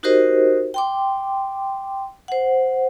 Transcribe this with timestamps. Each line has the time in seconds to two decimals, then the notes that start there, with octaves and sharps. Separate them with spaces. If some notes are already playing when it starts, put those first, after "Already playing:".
0.03 D#4 F#4 G4 A#4 C5 D#5
0.74 G5 C6 D6
2.28 C5 F#5